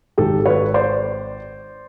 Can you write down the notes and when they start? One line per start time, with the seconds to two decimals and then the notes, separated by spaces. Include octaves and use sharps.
0.18 G#1 G#2 D#3 G4 A4
0.46 B4 C#5
0.74 C5 D5